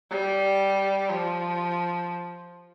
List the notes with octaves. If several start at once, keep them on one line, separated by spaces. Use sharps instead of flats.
G3
F3